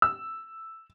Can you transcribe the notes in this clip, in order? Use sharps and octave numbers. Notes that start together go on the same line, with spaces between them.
E6